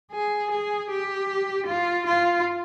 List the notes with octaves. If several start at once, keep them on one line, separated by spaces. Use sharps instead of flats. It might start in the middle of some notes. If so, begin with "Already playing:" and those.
G#4
G#4
G4
F4
F4